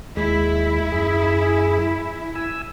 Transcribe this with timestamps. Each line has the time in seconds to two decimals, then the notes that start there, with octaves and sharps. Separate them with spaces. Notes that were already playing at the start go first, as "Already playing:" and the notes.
0.17 D#2 G#3 E4
0.92 F#2 G#4
2.35 G#5 E6